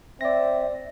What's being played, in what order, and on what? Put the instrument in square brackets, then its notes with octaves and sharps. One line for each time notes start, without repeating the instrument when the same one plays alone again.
[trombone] C4 [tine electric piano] D5 A#6 [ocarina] E5